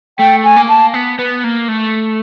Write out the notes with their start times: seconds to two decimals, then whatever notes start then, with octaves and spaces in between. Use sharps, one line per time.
0.19 A3 G5
0.44 G#5
0.56 A#3
0.69 A5
0.94 B3
1.19 B3
1.44 A#3
1.69 A3